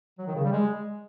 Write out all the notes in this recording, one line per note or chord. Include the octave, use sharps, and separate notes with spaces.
F#3
D#3
C#3
G3
G#3